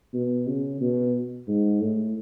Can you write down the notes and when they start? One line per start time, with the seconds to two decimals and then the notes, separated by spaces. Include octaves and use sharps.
0.14 B2
0.47 C#3
0.81 B2
1.48 G#2
1.81 A2